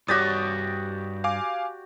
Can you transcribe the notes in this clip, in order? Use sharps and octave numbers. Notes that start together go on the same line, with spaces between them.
G2 F#4 G4 C#5 D5 D#6 A6 B6
F5 G#5 D6